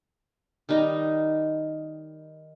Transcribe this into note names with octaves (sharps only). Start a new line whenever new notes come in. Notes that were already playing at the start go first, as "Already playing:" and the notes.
D#3 G3 D#4 A#5